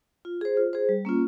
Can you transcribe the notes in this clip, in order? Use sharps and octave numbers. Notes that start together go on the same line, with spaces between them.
F4
G#4 C5
F4
G#4 C5
G3
A#3 C#4 F4